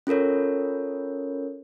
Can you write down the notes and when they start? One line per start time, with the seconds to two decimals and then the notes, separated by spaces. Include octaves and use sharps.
0.07 C#4 F4 A4 A#4 C#5